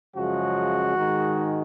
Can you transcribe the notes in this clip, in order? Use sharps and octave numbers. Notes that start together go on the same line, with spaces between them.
F#2 C#3 F3 G#3 F#4
G#2 D#3 G#3